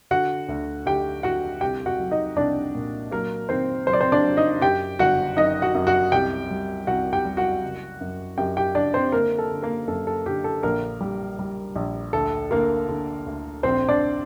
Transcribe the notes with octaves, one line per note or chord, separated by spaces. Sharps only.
D3 F#4 F#5
D2
D2 G4 G5
D3 F#4 F#5
C2 G4 G5
F#4 F#5
F#3
D#4 D#5
C2 D4 D5
A#2
F#3 A#3 A#4
D#3 C4 C5
F#3 C5
D5
C4 C5
D4 D5
F#3
D#4 D#5
F#2 G4 G5
G1 F#4 F#5
F#2 D#4 D#5
F#4 F#5
F#2
F#4 F#5
C2 G4 G5
G3
C2 F#4 F#5
G4 G5
G3
F#4 F#5
F#1
F#2
F#2 G4 G5
G4 G5
F#1 D4 D5
C4 C5
D3 A#3 A#4
A4
D3
A#3 A#4
F#2 A4
A4
D3 G4
A4
A#1 A#3 A#4
G3
G3
A#1
D2 A4
D3 A#3 A#4
D3
D2
A#1 C4 C5
D4 D5